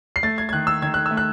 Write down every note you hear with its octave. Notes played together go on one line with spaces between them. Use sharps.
C7
A3 A6
G#6
G#6
D#3 F#6
E6
D#3 G#6
F#6
E6
A3
F#6